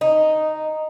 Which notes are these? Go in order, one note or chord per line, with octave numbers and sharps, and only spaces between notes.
D#4